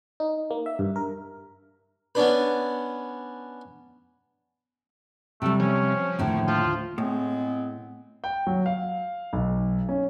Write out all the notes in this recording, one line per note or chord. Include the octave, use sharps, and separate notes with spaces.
D#4
A#3
E5
G2
A#4
B3 C#4 D4 B4
C3 G3 A3
F3 C#4
D#2 A2 D3
F3 F4
A2 G#3 B3 C4
G5
F#3
F5
B1
C#4